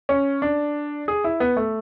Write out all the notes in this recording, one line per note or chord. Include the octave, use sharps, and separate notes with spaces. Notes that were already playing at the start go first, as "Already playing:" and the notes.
C#4
D4
G#4
E4
B3
A3